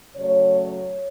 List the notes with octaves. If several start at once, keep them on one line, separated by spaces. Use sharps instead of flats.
C#3 F#3 A3 C#5
C#5